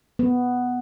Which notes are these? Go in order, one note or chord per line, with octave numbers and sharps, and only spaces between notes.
B3